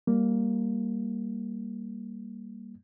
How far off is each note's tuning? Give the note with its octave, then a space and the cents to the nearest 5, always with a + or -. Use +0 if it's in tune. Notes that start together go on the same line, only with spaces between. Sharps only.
G3 +5 A#3 +0